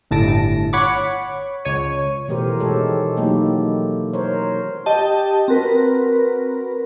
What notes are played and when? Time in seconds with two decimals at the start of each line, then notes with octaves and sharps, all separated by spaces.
0.11 G1 A2 A5 A#6 D7
0.73 C#5 F#5 B5 C#6 D6
1.65 C#2 C#5 D#7
2.28 B2 E3 A3 G4 A#4 C5
2.60 B2 D#3 G#3 G4 A4 C#5
3.17 F#3 A3 A#3 D#4 E4 G4
4.13 A#4 C5 C#5
4.86 G4 D#5 G5 A5
5.48 C4 F#4 A#4 B4